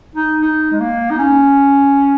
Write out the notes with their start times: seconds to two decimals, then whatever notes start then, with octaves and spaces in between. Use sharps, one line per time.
0.16 D#4
0.42 D#4
0.71 G#3
0.80 A#3
1.11 D#4
1.19 C#4